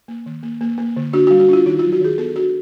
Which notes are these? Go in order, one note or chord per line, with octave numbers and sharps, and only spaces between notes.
A#3
D#3
A#3
A#3
A#3
D3
D4 F#4
F#4
G3
F#4
D4 F4
D#3 D#4
F4
F#3
F#4
D#3 G#4
B3 A4
D4 F#4